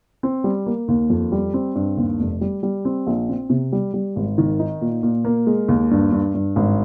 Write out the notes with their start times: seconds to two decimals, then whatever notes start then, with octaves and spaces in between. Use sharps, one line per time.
0.23 C4
0.44 G3
0.66 A#3
0.88 D#2
1.10 F2
1.32 G3
1.54 C4
1.75 G2
1.97 D#2
2.20 F1
2.41 G3
2.63 G3
2.85 C4
3.07 A#1
3.29 C4
3.50 C3
3.72 G3
3.94 G3
4.16 G#1
4.38 D#3
4.59 D#4
4.81 A#2
5.03 A#2
5.25 A#3
5.47 G#3
5.68 D#2
5.91 G2
6.12 G2
6.34 G2
6.56 G#1